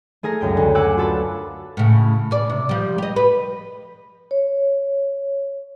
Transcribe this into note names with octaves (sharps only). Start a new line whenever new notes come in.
A3 G#4 A#4 A#6
C#2 F#2 G5
D2
F#5 G#5 D6 E6 F#6
F4 F#4 A4 B4
A2 C#3
C#3 D5
C3
F3 G3
G4 D#5
B4
C#5